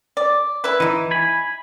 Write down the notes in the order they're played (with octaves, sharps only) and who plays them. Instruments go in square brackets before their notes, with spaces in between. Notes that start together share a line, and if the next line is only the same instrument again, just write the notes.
[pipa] D5
E4 B4
[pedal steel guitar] E3 [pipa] D#4 E4
[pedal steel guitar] G#5 B5